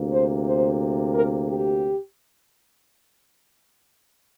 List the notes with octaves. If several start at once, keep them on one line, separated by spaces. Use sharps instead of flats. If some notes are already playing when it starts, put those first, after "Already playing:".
Already playing: D2 C3 A#3
C5
C5
A#4
G4